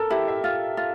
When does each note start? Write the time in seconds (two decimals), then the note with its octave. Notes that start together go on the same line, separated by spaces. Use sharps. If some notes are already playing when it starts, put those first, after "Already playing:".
Already playing: A4 A#4
0.10 E4 G4
0.28 E5
0.44 F4
0.77 F4